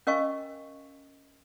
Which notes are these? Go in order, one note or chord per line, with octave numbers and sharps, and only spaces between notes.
C#4 A#4 D#5 F5 G#5 C#6